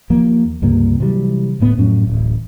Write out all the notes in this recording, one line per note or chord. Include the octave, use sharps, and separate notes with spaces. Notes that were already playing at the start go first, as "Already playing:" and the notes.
D#2 F3 A#3
C#2 G2 C3 A#3
C3 E3 F#3 G3
D1 A2 B3
F2 A2 F#3 C#4
D1 A1